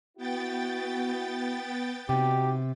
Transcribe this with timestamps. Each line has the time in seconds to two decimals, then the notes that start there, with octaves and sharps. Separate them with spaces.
0.17 B3 E4 F#4 G5 A6
2.09 C3 D#4 F#4 G4